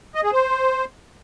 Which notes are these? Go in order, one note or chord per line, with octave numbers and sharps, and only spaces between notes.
D#5
G#4
C5